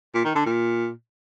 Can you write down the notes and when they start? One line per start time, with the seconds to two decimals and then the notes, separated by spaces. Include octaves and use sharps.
0.14 A#2
0.25 D#3
0.35 D3
0.46 A#2